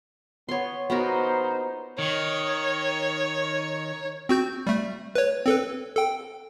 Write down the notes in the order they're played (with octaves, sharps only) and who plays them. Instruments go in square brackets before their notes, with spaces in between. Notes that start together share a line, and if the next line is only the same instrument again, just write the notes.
[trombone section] B3 [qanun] C#5 C6
[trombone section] A#1 D#4 C5 [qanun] B3 F#4 A#4
[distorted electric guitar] D#3 [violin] C#5
[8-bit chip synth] C4 F#4 G6
G3 A3
B4 C#5
C4 A4 B4
A4 G5